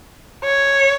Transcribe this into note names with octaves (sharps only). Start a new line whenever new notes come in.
C#5